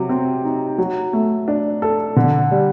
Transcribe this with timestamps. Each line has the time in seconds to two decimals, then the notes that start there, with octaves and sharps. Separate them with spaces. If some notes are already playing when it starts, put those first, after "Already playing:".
Already playing: C3 F#3
0.09 C4
0.44 D#4
0.78 F#3
1.13 A3
1.48 D4
1.82 A4
2.17 D3
2.51 G3